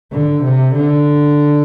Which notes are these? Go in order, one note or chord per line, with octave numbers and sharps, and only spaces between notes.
D3
C3
D3